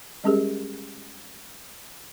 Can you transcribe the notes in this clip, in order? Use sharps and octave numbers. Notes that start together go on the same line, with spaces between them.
G3 G#3 C#4 G4 G#4 A#4